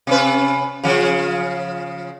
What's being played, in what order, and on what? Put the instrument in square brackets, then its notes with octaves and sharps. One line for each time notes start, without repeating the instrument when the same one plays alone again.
[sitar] C3 C#4 B4
C#3 F3